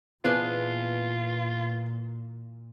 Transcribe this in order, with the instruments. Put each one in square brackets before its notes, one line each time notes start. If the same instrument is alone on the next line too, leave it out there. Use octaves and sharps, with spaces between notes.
[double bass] A#2 [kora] E3 D4 G#4 [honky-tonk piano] B3 [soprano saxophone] F4